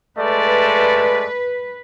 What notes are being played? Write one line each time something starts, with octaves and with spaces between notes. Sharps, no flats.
G#3 A3 B4 D5